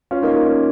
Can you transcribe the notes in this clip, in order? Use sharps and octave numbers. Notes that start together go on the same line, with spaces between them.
C#4 F4
A#3 D#4
A#3
C#4